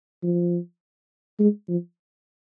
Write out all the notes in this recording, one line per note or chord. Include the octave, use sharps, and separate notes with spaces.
F3
G#3
F3